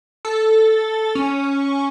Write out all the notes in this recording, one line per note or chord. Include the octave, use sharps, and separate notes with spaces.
A4
C#4